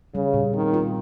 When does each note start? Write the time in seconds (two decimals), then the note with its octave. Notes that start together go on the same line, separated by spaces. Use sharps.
0.15 C#3 G3
0.34 A#2
0.53 D#3 C4
0.74 F4